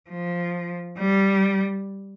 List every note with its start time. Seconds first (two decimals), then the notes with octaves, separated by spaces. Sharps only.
0.10 F3
0.99 G3